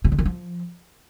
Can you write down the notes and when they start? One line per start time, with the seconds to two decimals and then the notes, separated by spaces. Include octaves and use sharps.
0.04 C3
0.12 D3
0.19 D#3
0.25 F3